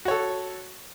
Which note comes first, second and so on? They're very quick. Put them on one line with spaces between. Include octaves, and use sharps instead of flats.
F#4 C#5 A4